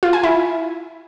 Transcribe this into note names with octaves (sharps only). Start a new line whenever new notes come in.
F4
G#5
E4